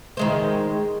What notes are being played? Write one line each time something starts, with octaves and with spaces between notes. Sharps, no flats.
D#3 G#3 C5